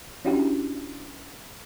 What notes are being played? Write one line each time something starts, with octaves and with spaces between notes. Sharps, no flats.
C#4 D4 E4 F#4 G4